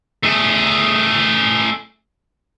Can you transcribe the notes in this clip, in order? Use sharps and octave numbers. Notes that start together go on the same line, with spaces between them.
A3 G#4